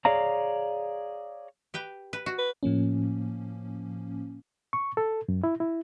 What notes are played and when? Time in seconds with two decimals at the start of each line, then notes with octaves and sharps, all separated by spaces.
0.05 G#4 C#5 D5 F5 A#5
1.74 G4 B4 G5
2.13 B4
2.26 F#4
2.38 B4
2.63 A2 F3 A#3 C#4
4.73 C#6
4.97 A4
5.29 F#2
5.44 E4
5.60 E4